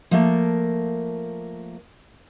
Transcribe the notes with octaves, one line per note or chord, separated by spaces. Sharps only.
F3 A3 A#3